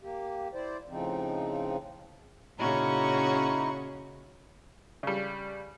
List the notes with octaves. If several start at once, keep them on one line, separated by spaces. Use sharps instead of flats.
A#3 G4
E4 C5 D5
A2 C#3 F3 C4 D#4
A#2 C#3 C#4 D#4 E4 F#4 C#6
C#3 G3